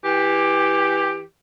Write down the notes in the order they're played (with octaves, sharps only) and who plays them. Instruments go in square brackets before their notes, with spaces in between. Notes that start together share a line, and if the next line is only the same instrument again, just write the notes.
[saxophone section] E3 G4